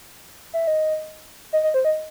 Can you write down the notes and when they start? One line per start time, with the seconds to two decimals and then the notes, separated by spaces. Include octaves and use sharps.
0.54 E5
0.67 D#5
1.53 D#5
1.63 D#5
1.74 C5
1.85 D#5